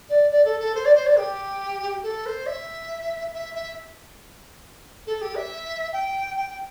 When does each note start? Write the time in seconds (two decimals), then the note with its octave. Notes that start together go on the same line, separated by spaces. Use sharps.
0.09 D5
0.31 D5
0.45 A4
0.60 A4
0.75 C5
0.85 D5
0.95 C5
1.06 D5
1.18 G4
2.03 A4
2.26 C5
2.46 E5
3.33 E5
3.55 E5
5.07 A4
5.21 G4
5.35 E5
5.93 G5
6.36 G5